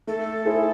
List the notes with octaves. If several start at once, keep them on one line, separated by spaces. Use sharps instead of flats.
A3 A4
E4 G#4 C5